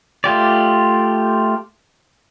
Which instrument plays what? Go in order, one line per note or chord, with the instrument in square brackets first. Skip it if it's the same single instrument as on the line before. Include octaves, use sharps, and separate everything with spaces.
[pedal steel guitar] A3 F4 G4 D5